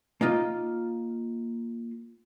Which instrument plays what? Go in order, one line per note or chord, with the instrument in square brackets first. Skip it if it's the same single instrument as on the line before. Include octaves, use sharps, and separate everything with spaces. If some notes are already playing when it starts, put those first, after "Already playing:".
[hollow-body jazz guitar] A#3 D#4 F4 D#5